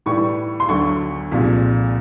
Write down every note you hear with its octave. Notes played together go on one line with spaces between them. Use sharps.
A2 E3 G3 C#6
C6
D2 D3 F#3 C#6
C2 A#2 F3 G#3